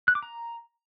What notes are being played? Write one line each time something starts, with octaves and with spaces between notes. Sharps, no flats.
F#6
D6
A#5